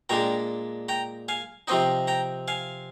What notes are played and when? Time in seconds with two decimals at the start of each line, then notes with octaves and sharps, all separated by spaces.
0.09 A#2 G#3 D4 G5 A#5
0.89 G5 A#5
1.28 F5 G#5
1.68 C3 F3 C4 D#4 D#5 G5
2.08 G5 A#5
2.48 F5 G#5